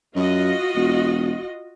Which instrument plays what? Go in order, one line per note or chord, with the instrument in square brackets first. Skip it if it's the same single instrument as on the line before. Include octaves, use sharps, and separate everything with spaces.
[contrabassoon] F#2 [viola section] F4 F#4 D#5
[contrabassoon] E1